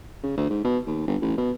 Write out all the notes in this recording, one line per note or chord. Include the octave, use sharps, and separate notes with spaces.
C#3
D2
G#2
B2
D#2
G1
A1
B2